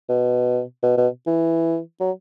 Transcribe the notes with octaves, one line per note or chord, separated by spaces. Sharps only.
B2
B2
B2
E3
F#3